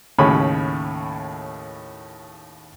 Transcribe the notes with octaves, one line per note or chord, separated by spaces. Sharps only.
D#2 A2 C#3 C#5 G#5 B5